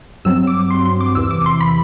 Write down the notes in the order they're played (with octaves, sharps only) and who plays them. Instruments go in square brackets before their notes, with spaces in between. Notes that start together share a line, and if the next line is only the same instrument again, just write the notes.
[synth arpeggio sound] G2 F#3 C4 E6
D6
C6
C6
D6
E2 C3 E3 E6
D6
C6
B5